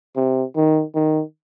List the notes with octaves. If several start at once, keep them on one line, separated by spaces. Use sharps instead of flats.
C3
D#3
D#3